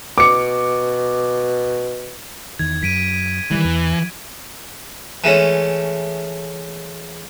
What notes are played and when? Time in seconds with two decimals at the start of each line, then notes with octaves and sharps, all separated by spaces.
0.18 B2 D6 C#7
2.59 E2 D#3 G#6
2.83 F#2 B6 D7 D#7
3.51 D#3 E3 G3
3.65 E2
5.24 E3 G#3 A3 C#4